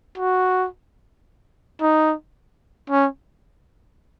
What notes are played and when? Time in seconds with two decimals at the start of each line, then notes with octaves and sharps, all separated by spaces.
0.18 F#4
1.81 D#4
2.90 C#4